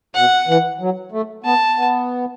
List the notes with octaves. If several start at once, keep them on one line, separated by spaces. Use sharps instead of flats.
B2 F#5
E3
F#3
A3
B3 A5
B3